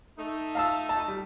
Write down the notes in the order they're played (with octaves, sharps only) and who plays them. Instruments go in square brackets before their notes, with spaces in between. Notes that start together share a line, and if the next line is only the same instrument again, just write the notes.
[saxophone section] A3 D#4
[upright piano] F5 A5 E6
A5
G3